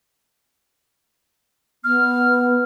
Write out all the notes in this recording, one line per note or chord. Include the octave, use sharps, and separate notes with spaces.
B3 F6